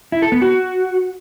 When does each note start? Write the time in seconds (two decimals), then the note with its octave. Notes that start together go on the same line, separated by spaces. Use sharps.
0.12 E4
0.22 A4
0.32 B3
0.42 F#4